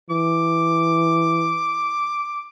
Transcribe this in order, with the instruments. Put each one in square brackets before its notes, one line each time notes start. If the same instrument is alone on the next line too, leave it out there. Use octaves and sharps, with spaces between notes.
[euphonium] E3 [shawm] D6